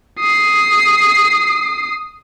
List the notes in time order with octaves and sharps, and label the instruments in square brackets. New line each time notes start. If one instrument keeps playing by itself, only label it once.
[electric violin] D#6 C7